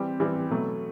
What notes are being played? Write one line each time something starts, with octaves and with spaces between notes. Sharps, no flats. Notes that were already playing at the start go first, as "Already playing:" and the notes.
Already playing: E3 G3 C4 G4
E3 G3 C4 G4
B2 F#3 A3